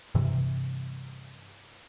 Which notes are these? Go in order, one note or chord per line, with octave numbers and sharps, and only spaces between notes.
G2 C3 E3